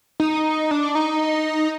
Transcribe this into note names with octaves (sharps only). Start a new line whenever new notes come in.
D#4
D4
D#4